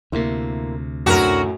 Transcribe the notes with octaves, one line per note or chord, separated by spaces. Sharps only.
D2 C3 A#3 E4 C5
F#2 A2 D3 F#3 F#4 A#4 C5